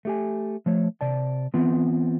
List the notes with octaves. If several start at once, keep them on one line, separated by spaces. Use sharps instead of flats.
A3 G4 G#5
F3 A3 C#5
C3 D5 A5
E3 B3 C4 F4